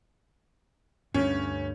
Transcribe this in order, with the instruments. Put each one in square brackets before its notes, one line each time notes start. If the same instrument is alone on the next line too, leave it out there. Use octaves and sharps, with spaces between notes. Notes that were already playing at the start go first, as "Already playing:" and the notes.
[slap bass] D2 G2 [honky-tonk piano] C#4